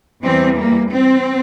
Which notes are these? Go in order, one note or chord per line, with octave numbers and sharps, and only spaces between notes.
E2 E3 G3 C4
A#3
C4